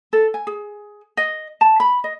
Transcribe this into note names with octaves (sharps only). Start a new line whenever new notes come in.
A4
G#5
G#4
D#5
A5
B5
D#5